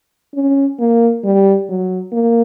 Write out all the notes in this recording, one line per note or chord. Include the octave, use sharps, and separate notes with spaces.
C#4
A#3
G3
F#3
A#3